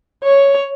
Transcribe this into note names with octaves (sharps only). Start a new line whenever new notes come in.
C#5